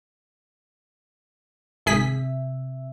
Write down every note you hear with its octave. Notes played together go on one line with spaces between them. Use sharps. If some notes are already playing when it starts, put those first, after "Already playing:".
G#1 C3 G#4 E5 B6